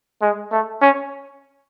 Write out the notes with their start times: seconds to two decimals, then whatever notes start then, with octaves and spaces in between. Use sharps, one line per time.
0.22 G#3
0.52 A3
0.82 C#4